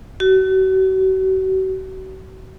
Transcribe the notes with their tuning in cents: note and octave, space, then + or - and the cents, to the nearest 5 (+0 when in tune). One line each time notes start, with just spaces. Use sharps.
F#4 +40